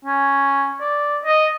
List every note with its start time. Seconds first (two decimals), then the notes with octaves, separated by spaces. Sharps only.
0.05 C#4
0.81 D5
1.25 D#5